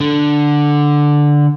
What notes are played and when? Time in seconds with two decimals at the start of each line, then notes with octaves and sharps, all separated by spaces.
0.01 D3